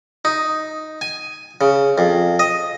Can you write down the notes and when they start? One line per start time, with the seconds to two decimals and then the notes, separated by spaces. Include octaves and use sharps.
0.25 D#4
1.01 G#5
1.61 C#3
1.98 F2
2.39 D#5